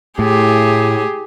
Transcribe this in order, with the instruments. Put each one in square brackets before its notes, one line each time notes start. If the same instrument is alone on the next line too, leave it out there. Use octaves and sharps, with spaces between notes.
[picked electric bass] A2 [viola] G4 G#4